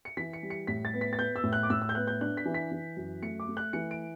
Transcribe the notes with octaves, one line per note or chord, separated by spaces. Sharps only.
C#7
E3 B6
C#7
G3
C#7
A2 B6
A6
B3
B6
A6
B3 G6
E6
A2
F#6
D6
A2 E6
E6
G6
B3 F#6
G6
D4 F#6
B6
E3
B6
E3
F#2
A3 C#7
D6
A3
F#6
E3 C#7
D7